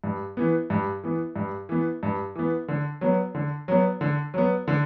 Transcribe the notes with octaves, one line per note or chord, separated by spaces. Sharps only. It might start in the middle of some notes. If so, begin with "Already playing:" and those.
G2
E3 B3
G2
E3 B3
G2
E3 B3
G2
E3 B3
D3
F#3 B3
D3
F#3 B3
D3
F#3 B3
D3